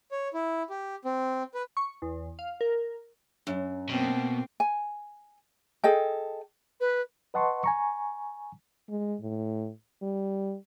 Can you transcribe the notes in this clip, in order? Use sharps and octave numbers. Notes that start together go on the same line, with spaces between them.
C#5
E4
G4
C4
B4
C#6
E2
F5
A#4
F#2
B2 A#3 C4
G#5
G#4 A4 D#5 G5
B4
B4 D#5 F#5 A5 C6 C#6
G#5 A#5 C#6
G#3
A2
G3